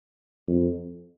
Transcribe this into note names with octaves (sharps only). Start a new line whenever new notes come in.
F2